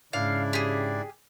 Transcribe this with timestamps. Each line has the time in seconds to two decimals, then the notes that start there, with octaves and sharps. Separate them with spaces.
0.13 G#2 C#3 D4 E4 D5 F5
0.53 G4 G#4